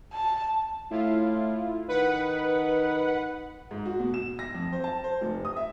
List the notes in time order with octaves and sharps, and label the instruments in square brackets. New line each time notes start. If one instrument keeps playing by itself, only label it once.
[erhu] A5
[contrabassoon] A2 [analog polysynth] E4 F4
[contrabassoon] D#3 [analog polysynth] B4 F#5
[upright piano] G#2
F#4
B2
E7
A#6
F2
C5
A5
C5
F1
D#6
E5